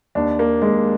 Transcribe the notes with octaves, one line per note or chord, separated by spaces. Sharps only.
D#2 D4
A#3
D#2 G#3